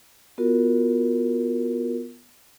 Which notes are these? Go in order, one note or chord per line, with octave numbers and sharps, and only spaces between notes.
B3 F4 F#4 A#4